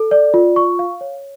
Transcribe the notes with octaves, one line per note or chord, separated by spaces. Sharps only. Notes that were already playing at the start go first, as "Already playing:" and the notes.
Already playing: A4
D5
F4
C#6
F5
C#5